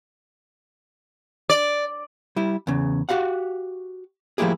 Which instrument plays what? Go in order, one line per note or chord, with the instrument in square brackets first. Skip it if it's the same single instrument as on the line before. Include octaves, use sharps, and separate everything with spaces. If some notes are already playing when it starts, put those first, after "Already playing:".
[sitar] D5
[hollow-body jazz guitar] G3 E4
E2 C#3
F#4 G4 F5 F#5
F3 A3 A#3 E4 G4 G#4